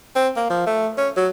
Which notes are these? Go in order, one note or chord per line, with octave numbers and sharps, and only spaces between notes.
C4
A#3
F3
A3
C#4
F#3